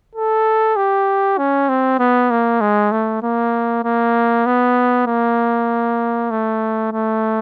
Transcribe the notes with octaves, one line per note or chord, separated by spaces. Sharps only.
A4
G4
C#4
C4
B3
A#3
G#3
A3
A#3
A#3
B3
A#3
A3
A3